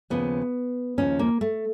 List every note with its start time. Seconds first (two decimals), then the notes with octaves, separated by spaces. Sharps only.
0.10 D#2 C#3 F3 B3
0.98 D#2 C#3 F3 C#4
1.19 A#3
1.41 A3